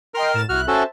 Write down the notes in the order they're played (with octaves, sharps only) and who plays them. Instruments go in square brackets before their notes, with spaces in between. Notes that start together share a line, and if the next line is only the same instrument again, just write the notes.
[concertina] A#4 F6 [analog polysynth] D#5 G5 C6
[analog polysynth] A2 A6 E7
[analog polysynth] C2 E4 F#6 [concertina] F#4 F6
[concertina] C#4 F#4 A4 [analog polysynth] C5 E5 A5